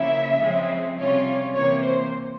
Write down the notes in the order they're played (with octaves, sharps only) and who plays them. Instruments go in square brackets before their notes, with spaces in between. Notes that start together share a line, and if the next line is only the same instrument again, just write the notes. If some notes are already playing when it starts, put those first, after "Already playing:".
Already playing: [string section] C#3 F3 A#3 E4 [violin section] E5
[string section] C#3 F3 G#3 C4
[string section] C3 G3 C#4 F4 [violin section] C#5
[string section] C3 E3 A#3 [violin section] C#5
[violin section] C5